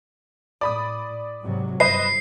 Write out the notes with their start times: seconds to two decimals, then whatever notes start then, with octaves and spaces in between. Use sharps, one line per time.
0.61 A2 D5 B5 D#6
1.43 G#2 C3 F#3
1.80 G1 B4 C5 D#5 C7